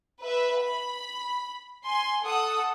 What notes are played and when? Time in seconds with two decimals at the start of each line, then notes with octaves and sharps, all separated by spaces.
0.23 B4 E5
0.61 B5
1.86 G#5 C6
2.24 A4 F#5 D#6